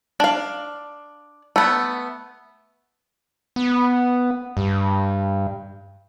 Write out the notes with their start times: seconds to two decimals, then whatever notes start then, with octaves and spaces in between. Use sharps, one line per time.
0.20 D4 F5
1.56 A3 B3
3.56 B3
4.57 G2